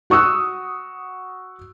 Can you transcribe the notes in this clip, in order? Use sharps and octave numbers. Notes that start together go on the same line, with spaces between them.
F#4 C#6 D#6 E6 F#6